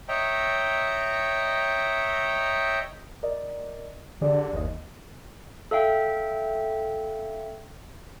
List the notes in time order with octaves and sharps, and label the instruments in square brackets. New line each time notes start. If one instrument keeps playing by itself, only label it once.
[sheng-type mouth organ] C#5 D#5 E5 G5 A#5
[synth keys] A#4 D5 D#5
[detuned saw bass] D3 [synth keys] G4 G#4 D5
[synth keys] G1 D#5 [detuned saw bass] D#2
[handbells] A4 E5 F5 G5